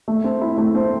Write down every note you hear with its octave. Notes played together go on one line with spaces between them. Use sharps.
A3
C4
E4
A3
C4